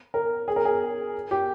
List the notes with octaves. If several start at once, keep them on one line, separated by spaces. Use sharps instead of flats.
A#4
G#4
A#4
G#4
G4